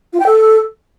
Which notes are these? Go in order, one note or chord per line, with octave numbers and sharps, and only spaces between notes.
F4
G5
A4